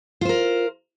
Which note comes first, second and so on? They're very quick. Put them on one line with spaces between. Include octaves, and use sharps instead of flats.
F4 C5 A#4